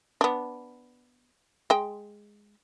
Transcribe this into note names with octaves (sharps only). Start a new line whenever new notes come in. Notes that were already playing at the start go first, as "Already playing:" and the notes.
B3 D4
G#3 G5